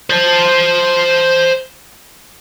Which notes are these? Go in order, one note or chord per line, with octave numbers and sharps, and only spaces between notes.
C5 A5